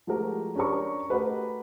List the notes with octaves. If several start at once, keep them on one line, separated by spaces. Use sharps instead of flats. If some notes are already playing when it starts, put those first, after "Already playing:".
F3 G#3 A3 F#4 G4 A#4
C#4 D4 G4 A#4 C#6
A3 F#4 G4 A#4 B4 D#5